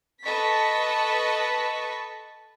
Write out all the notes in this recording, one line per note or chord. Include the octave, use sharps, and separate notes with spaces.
A4 B4 D#5 A5 C#6 B6